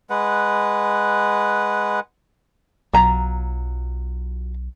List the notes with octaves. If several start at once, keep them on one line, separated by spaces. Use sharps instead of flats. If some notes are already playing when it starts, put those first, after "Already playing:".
G#3 B4 F#5
B1 F#3 F4 A#5